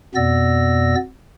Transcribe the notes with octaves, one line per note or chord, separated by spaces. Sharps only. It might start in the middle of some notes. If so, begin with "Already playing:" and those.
F2 B2 B3 D5 E6 A#6